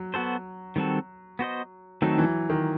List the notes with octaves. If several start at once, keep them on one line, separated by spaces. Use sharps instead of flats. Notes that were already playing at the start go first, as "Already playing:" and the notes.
Already playing: F#3
B3 F#4 A4 C5
D#3 G3 C4 F#4 A4
B3 F#4 C5 D#5
D#3 F#3 A3 C4 D#4 A4
E3
D#3